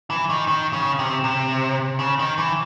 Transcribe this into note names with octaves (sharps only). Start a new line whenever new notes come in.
E3
D#3
D#3
C#3
C3
C3
C#3
D#3
E3